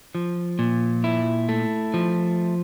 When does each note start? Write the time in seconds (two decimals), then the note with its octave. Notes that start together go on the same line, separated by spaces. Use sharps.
0.15 F3
0.59 A#2
1.04 E4
1.49 A3
1.94 F3